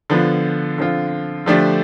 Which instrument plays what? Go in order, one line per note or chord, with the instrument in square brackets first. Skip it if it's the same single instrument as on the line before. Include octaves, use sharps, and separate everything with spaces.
[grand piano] D3 F3 B3 F4
D3 F3 C4 F4
D3 F3 A3 D4 G4